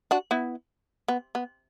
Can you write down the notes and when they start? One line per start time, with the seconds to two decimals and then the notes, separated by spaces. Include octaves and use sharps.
0.11 D4 F#4
0.31 B3 E4
1.08 B3
1.35 B3